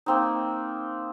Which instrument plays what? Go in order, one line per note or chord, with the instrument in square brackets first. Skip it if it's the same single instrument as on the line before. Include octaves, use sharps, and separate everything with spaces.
[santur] A#3 C4 D#4